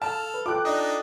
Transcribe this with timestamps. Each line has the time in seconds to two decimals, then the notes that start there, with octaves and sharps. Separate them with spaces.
0.02 A4 F5 A5 F6
0.34 B4
0.46 F4 A4 G5 D6 F#6
0.65 D4 D#4 D#5